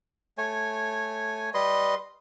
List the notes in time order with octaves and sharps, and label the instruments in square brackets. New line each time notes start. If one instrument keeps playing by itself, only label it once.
[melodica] A3 C#5 G#5
G3 B4 D#5 C6